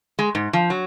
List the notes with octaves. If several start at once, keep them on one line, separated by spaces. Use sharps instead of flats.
G#3
G#2
F3
F#3